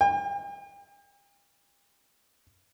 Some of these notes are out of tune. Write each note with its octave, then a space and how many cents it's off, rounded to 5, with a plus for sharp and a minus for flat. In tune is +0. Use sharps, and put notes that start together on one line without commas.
G5 +45